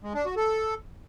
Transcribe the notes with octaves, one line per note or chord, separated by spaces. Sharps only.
G#3
D4
F#4
A4